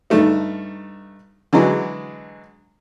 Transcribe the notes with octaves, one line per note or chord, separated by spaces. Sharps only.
G2 D#3 A3 D#4
D3 E3 F#3 G#3